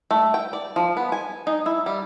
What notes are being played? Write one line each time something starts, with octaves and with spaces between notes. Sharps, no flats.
A3
G5
D5
F3
B3
G#5
D#4
E4
G3